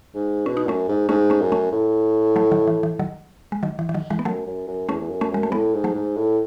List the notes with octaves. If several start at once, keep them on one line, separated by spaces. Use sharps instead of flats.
G#2
B2 C#4
D#4
F#2 A3 C#4
G#2
G#2 A3 C#4
A3 C#4
F#2
A3 C#4
A2
F#3 A3
D#3 F#3
E3
E3
D#3 F#3
G#3
D#3 F#3
E3
E3
D#3 F#3
E3 G#3
B3
F#2 F#3 A3
F#2
F#2
E2 A3 C#4
E2
F#2
A3 C#4
F#2 G#3
A3
A2 G#3 B3
G#2
F#3 A3
G#2
A2